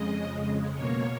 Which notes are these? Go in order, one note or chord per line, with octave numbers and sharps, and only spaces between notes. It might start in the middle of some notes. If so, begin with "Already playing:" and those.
Already playing: F2 C#3 G#3 D#5
B2 A#3 C#5